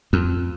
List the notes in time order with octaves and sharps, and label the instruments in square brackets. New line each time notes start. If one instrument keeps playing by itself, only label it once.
[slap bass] F2